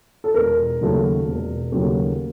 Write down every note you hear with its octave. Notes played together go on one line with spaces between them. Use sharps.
A4
E1 A#4
D#2 C#3 F#3 A3
E1
D#2 C#3 F#3 A3